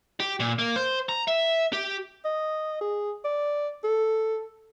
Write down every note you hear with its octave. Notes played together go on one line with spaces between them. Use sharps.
G4
A#2
A#3
C5
A#5
E5
G4
D#5
G#4
D5
A4